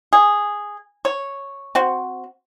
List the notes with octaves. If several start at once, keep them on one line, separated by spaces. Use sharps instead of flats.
G#4
C#5
C4 F#4